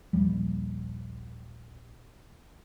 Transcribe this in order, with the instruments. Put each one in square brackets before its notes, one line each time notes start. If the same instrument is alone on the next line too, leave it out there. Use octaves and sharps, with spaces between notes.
[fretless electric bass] A#1 D#2 F3 G3